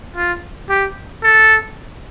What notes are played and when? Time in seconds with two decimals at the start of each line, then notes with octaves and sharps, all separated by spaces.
0.16 F4
0.69 G4
1.23 A4